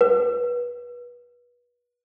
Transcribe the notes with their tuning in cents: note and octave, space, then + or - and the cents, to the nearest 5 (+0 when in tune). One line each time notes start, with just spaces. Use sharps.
B4 -30